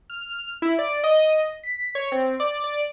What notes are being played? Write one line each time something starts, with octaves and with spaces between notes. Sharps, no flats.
F6
E4
D5
D#5
B6
C#5
C4
D5
D5